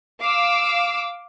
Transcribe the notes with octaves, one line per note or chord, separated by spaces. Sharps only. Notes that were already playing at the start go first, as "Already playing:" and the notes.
F5 D6 E6